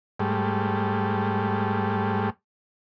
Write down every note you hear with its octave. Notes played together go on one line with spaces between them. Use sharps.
G#2 G3 A3